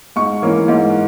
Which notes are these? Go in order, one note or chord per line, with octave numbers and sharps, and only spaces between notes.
G#2 C#6
E3 A#3 C#4
G#2